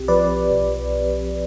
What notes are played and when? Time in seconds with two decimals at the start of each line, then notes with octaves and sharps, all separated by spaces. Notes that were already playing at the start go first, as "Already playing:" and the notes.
Already playing: B1 C4 G4
0.08 F3 B4 D5
0.51 B1